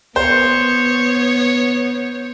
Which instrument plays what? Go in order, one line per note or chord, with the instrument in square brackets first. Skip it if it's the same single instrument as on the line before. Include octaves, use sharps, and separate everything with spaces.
[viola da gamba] B3 C#5 [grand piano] C5